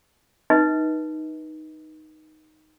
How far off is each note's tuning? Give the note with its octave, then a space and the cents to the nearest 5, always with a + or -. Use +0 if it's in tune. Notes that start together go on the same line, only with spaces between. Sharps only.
D#4 +0 B4 -30 D#5 +40